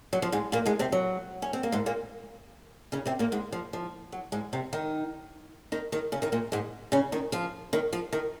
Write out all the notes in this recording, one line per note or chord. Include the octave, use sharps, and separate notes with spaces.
F#3
F3
G#2 G#3
A#2 A#3
G#2 G#3
C3 C4
F#3
C#4
C4
A#3
G#2 G#3
A#2 A#3
C#3 C#4
C3 C4
A#2 A#3
G#2 G#3
F3
F3
F#3
G#2 G#3
C3 C4
D#3 D#4
D#3 D#4
D#3 D#4
C#3 C#4
D#3 D#4
A#2 A#3
G#2 G#3
C#3 C#4
D#3 D#4
F3 F4
D#3 D#4
F3 F4
D#3 D#4